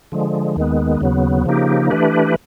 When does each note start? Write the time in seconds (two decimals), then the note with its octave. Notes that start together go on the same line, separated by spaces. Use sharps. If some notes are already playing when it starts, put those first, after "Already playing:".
0.12 D3 F3 G#3
0.56 D#2 D#3 G#3 B3
1.01 D#2 C#3 F#3 B3
1.46 C#3 F3 A#3 D#4 G4
1.90 E3 A3 D4 G4 B4